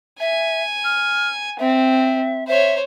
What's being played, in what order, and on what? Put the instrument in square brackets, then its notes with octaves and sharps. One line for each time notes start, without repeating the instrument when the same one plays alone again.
[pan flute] E5 [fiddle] G#5
[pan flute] F6
[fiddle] C4 [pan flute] E5
[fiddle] C5 C#5 [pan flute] E5